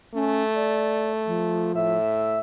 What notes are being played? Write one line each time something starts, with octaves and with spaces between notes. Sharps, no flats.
A3 C#4
D5
F3
A2 E5